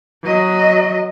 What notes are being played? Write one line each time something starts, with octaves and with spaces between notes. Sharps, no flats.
F#3 D#5